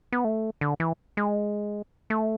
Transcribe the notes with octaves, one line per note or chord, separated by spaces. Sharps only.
B3
A3
D3
E3
G#3
A3